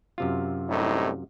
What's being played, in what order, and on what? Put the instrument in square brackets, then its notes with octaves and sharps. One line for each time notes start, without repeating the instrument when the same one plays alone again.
[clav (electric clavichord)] F#2 C3 F4
[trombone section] C2 A2 D#4